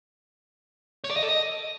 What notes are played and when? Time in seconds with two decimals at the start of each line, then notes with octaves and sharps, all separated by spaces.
1.04 C#5
1.10 D5
1.17 D#5
1.23 A4
1.29 D#5